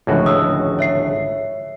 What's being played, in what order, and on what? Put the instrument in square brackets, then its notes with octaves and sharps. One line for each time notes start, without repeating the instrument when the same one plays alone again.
[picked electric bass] G#1 D3 F3 [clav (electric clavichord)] C#2 A2 F#4
[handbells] D#6 E6
C#5 E5 C7